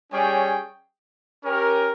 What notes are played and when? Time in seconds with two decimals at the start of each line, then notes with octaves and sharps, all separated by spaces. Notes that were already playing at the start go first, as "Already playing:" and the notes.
0.11 G3 C#4 G#4 C#5 G5
1.44 C#4 G4 A#4